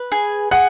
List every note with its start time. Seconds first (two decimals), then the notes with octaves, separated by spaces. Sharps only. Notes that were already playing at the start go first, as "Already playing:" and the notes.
Already playing: B4
0.12 G#4
0.51 G#4 F#5